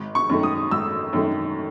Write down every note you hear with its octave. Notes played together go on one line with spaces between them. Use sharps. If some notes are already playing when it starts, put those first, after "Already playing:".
Already playing: G#1
C#6
F#2 D#3 A3
D#6
G#1 E6
F#2 D#3 A3